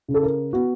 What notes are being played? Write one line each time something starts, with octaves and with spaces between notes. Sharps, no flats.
C#3
A4
A#4
B3 F#4